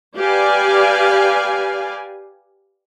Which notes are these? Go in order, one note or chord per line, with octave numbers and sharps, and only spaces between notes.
G4 B4 D5 F5 G#5